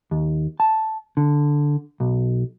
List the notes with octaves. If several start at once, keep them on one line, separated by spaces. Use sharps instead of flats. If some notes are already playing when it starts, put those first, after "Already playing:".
D#2
A5
D3
B1